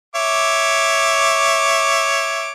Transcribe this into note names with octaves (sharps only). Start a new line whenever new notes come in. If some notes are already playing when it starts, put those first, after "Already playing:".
C#5 E5 D6